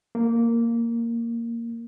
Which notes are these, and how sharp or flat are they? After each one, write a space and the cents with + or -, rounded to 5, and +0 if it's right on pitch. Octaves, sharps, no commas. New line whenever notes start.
A#3 -5